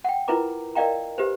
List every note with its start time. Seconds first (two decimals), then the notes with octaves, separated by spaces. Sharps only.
0.04 F#5 G5
0.28 E4 F4 A#4 B4 A#5 D6
0.75 A#4 D5 D#5 F5 G5 A#5
1.18 G4 B4 C5